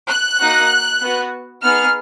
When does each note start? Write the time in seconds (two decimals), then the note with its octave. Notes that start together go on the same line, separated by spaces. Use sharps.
0.08 F#6
0.40 A#3 D#4 F#4
1.01 B3 F#4
1.62 B3 D#4 G#4 F6